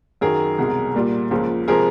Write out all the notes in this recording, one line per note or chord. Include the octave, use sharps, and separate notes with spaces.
F#2 D#3 F#3 G#4 A#4
C2 B2 G#3
A#2 G3 A#3
C#2 C#3 F3 A#3
C3 F3 G#3 G#4 A#4